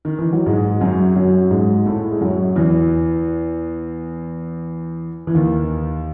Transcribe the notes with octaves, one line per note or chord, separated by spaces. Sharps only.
D#3
E3
F#3
G#2 G#3
F#2 F#3
F#2 F#3
G#2 G#3
A2 A3
G#3
F#2 F#3
E2 E3
E3
D#2 D#3